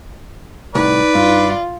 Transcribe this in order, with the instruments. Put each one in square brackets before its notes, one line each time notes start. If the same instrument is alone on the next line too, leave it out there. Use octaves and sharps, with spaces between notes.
[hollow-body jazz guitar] C2 A2 [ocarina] D#4 [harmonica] B4 D5
[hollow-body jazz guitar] G2 [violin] F4